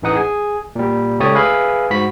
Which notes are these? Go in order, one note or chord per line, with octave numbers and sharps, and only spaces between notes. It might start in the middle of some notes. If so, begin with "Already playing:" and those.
A1 E3 D#4 F#5 D#6
G#4 G#5
A#2 G3
C#2 A3 G4 C#5 D5 D#6
G#4 B4 E5 F5 G#5 B5
G#2 F#4 B5 B6